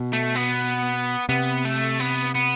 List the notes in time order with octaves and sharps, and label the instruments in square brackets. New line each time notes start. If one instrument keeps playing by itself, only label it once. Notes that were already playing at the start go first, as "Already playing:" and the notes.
Already playing: [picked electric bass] B2
[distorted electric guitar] A3
B3
[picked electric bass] C3 [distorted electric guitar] B3
[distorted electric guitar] A3
B3
B3